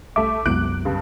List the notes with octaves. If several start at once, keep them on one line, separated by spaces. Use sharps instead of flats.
B1 A3 E5 D6
C2 F#2 G#3 B3 E4 F#6 D7
G2 C#3